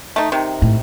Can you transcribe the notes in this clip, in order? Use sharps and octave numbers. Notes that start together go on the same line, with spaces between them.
A3 D#4
C3 D#3
A2